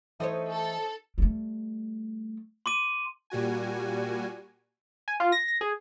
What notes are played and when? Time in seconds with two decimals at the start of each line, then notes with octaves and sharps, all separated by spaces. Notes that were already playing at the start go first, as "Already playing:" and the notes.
0.20 E3 A3 D#4 C5 C#5
0.50 A4
1.18 G3 A3
2.66 C6 D6 D#7
3.30 A#2 G3 F#4 G#5
5.08 G#5
5.20 F4
5.32 A#6
5.48 A#6
5.61 G#4